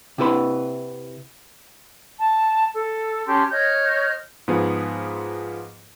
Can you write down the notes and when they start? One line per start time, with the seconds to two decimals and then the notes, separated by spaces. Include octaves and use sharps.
0.18 C3 E4 B4 C6
2.18 A5
2.73 A4
3.27 C#4 G4 A5 C6
3.51 C#5 D#5 F6 G6
4.48 G#2 F3 B3 G#4